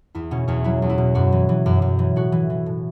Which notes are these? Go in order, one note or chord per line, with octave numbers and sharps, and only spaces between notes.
E2 E4
B2 C#4
E2 C#4
F#3 E4
E2
E4
B2
F#2 F#4
E3
E3
F#2
F#2
E3
A2 F#4
E3
E3
A2